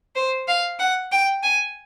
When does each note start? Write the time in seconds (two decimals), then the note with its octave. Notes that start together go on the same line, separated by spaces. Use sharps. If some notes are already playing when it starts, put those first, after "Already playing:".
0.16 C5
0.48 F5
0.79 F#5
1.12 G5
1.43 G#5